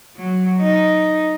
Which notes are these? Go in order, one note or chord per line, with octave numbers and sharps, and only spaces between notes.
F#3
D#4